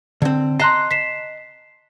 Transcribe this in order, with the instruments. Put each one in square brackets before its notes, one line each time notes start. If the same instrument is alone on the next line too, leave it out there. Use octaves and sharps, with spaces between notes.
[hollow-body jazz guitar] D3 C4
[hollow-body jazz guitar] D#5 A5 A#5 [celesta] C6 F#6 C7
[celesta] B6 C7 E7